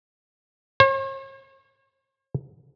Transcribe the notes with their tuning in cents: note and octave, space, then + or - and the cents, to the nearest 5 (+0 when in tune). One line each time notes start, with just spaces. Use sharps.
C#5 -45